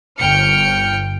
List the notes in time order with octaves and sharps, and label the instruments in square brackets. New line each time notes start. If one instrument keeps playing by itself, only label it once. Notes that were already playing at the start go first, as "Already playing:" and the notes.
[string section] G1 G5 F6 C#7